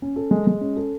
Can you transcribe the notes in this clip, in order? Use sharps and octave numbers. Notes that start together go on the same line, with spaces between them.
C#4
A4
G#3
G#3
C#4
A4